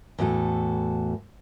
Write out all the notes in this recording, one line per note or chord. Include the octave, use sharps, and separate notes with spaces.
E2 A2 F#4 A4